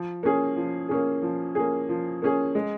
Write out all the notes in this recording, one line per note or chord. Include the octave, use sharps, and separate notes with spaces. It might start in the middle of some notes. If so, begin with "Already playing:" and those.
Already playing: F3
A#3 C#4 G#4
F3
A#3 C#4 G#4
F3
A#3 C#4 G#4
F3
A#3 C#4 G#4
G#3